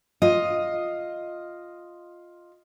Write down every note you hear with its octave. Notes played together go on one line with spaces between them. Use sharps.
F4 D#5